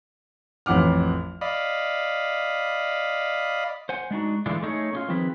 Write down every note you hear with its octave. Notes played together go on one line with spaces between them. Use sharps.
A1 F2 F#5 D6 F6
D5 D#5 F5 B5
C5 F#5 G#5
G#3 D4 D#4 F#4
D3 E3 G#3 A3 D4 F4
A3 D#4 E4 G#4 C#5
C#4 D#4 F4
D#3 F3 C4 F4 G#4 B4